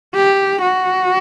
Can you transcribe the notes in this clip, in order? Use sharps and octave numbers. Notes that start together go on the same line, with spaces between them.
G4
F#4